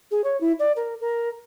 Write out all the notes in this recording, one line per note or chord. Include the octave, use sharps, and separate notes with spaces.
G#4
C#5
E4
D5
A#4
A#4